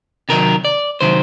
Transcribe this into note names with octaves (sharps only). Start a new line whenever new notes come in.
C3 D#3 F#3 A#4
D5
C3 D#3 F#3 C5